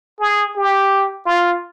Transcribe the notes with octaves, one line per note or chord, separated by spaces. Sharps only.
G#4
G4
F4